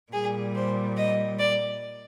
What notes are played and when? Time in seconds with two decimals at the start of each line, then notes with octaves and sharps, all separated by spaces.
0.12 A#2 G3 G#4
0.55 C5
0.97 D#5
1.39 D5